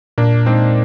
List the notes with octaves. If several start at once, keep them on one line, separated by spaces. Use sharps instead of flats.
A#2 A#3 D4
G#3 C4 D#4